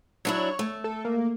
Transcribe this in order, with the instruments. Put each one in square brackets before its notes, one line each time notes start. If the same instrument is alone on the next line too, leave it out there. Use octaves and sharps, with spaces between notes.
[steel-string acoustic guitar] F#3 D4 E4 [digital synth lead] C#5
[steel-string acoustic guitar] A3
[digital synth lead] A4
A#3